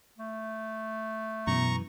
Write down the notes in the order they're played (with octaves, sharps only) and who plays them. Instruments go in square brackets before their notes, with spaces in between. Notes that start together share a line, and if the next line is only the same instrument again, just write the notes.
[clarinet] A3
[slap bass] F#2 E3 [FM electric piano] B2 [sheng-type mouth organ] A#5 C#6